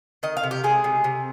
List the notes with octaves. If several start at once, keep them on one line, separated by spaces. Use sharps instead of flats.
D#3 D#5
F5
C3
G4
G#3 G#4
C3
C3